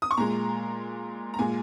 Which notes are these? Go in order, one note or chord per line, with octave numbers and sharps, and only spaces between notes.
D#6
C#6
A#2 G#3 A#5
A#5
A#2 G#3 G#5